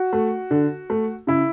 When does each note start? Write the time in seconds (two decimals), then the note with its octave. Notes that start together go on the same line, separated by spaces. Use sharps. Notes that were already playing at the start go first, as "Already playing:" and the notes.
Already playing: F#4
0.13 A3
0.51 D3
0.90 A3
1.27 C#3 E4